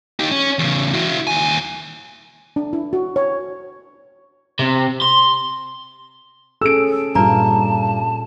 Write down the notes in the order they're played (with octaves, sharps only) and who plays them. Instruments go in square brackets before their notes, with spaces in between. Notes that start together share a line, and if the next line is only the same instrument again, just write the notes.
[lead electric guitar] D#4 G4
C#4
E2 C#3
E4 F#4
D#2 G#5
[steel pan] D4
E4
F#4
C#5
[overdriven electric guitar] C3
C6
[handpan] C#4 G#4 A4 [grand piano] E6 D7
[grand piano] G2 [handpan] A#2 F4 [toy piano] B4 D5 A#5 [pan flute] A5